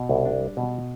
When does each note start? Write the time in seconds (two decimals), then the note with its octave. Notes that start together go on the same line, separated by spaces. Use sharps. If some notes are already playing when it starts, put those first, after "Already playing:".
Already playing: B2
0.09 C2
0.25 D4
0.41 G3
0.57 B2